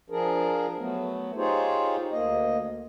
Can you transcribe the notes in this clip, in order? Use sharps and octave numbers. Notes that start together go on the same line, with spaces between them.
F3 D4 G#4 A#4
F#3 A3 B3
D#4 F4 G4 G#4 C5 C#5
D2 A#3 D#5